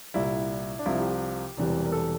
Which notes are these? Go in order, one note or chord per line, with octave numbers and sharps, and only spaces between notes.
C2 A#2 G3 E4
D4
C2 C3 F3 E4
G4
G4
E1 E2 C3 E3 G3
A#4
A4